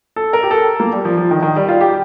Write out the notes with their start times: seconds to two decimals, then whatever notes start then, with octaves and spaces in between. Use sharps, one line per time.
0.16 A4
0.33 A#4
0.43 G4
0.51 A4
0.80 A#3
0.93 G3
1.05 F3
1.17 F3
1.31 D#3
1.42 D#3
1.56 G3
1.68 F4
1.81 G4